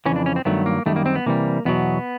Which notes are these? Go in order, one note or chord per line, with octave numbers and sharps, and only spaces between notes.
F2 C#3 E3 C#4
D4
C#4
C4
G2 D#3 F#3 A3 B3
A#3
F#2 D#3 G3 A3
A#3
C4
B3
C3 E3 G3 A#3
E2 B2 F#3 B3